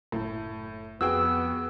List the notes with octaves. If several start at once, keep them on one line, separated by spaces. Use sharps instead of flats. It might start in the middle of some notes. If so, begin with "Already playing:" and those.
F#1 A2
F2 B3 F#4 G#4 G5 E6